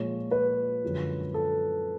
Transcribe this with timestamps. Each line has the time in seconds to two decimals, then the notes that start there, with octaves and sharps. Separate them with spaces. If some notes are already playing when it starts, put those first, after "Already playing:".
Already playing: A#2 F3 G#3 C#5
0.31 B4
0.84 F#2 D3 F3 G#3
1.34 A4